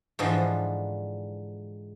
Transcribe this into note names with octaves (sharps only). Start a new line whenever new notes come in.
G#2 D3 E3 F3